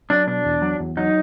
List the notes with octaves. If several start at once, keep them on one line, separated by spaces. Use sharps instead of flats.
F#3 D4
B2 D4
E2
F#3
E2
F#3 D#4